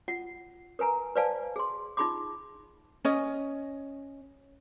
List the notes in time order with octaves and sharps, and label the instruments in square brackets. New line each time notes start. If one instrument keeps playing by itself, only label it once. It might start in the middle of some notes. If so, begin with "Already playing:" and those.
[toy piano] F4 F#5
A#4 B4 G#5 A#5
B4 C5 D5 F5 G#5 A5
G#4 C6
D#4 F4 G#4 B5 C6 D6
[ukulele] C#4 D#5